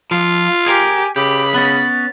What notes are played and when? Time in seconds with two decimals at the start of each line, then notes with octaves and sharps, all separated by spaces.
0.11 F3 F4
0.66 G4 G#4 A#4 G#5
1.16 C#3 G4 B5 D6
1.55 B3 C#4 A6